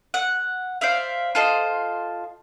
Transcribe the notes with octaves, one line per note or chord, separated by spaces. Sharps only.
F#5
C5 D5 E5 F5
F4 A4 C5 D#5